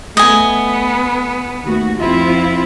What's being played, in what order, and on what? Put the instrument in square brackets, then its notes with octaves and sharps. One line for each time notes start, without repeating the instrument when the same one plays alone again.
[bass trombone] A3 [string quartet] B3 [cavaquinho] D#5 G#5
[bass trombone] D#2 [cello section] A3 F#4
[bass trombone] F2 [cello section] C4 F4 [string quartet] E4